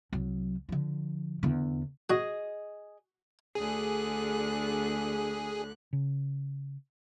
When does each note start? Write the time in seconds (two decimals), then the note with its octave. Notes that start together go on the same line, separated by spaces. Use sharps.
0.13 C2 F#3
0.69 D3 F3
1.43 E2 D3
2.10 F#4 G#4 D#5
3.55 D2 D3 G#4 F#6
5.93 C#3